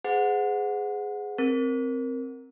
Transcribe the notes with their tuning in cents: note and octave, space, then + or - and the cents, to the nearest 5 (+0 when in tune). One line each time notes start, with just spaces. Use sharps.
G#4 +0 C5 -40 F#5 -20
C4 +0 A#4 +0